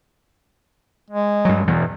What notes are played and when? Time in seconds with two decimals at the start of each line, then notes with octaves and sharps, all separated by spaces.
1.10 G#3
1.45 G2 F#3
1.67 E2 B2 E3